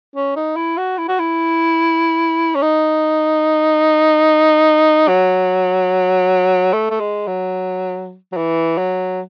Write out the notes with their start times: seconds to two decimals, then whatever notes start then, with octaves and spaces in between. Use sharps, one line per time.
0.16 C#4
0.36 D#4
0.57 E4
0.77 F#4
0.98 E4
1.09 F#4
1.20 E4
2.55 C#4
2.62 D#4
5.08 F#3
6.73 A3
6.91 A3
7.00 G#3
7.27 F#3
8.33 F#3
8.37 E3
8.78 F#3